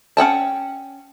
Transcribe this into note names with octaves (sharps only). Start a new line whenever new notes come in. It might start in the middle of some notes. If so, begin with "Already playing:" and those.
C#4 F#5 G5 A5